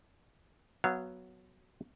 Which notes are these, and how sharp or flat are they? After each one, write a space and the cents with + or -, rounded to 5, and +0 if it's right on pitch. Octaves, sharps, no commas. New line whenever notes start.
F#3 +0 B3 +0 F5 -25